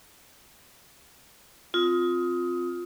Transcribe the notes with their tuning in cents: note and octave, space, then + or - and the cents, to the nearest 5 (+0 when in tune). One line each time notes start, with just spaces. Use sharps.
C4 +0 F4 +15 D#6 +20